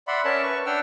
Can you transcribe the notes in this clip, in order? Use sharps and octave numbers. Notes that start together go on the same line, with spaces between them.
D5 E5 F#5 B5 C6
C#4 A#4 C#5 E5 A5
B4 C#6
D4 F#5 G5 E6 F6